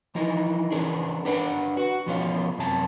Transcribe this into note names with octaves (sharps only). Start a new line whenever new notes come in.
E3 F3 D#4 E4
E3 C#4 D4 G#4 A#4
D4 B4 D5 F#5
F#4
E2 B2 F3 C#4 F4
F#2 C3 A5